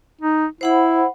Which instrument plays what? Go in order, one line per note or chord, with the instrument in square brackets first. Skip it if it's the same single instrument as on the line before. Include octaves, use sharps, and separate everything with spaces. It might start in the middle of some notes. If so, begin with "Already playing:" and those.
[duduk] D#4
[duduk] E4 [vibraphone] C5 F#5 B5